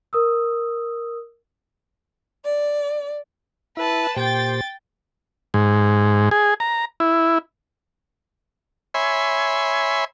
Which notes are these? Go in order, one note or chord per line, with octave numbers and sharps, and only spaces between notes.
A#4 D#6 E6
D5
E4 B4 A5
A#2 G4 C5 G5 A6
G#2
G#4
A#5
E4
C#5 E5 G#5 B5 C6